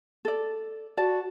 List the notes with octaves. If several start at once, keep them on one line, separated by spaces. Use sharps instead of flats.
A4 D5
F#4 D5 A5